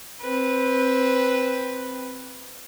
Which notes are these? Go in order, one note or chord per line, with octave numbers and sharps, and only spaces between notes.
C4 B4